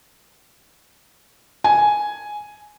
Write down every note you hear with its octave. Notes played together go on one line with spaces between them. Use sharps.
G#5